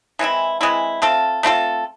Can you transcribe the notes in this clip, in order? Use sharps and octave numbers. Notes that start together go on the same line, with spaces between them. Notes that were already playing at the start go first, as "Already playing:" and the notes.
E3 G#3 C4 E4
E3 G#3 C4 E4
A3 C4 F4 A4
A3 C4 F4 A4